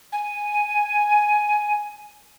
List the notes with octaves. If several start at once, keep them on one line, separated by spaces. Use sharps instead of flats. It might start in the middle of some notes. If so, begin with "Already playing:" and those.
G#5